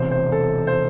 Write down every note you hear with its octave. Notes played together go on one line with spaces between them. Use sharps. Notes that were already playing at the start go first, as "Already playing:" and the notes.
Already playing: E1 E2 C3 C5
C5
A4
C5